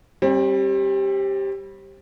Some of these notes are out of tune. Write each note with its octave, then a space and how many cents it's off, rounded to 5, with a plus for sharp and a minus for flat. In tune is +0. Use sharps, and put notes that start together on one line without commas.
G3 +0 C4 +35